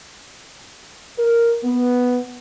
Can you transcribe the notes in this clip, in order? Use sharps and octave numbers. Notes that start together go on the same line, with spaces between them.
A#4
B3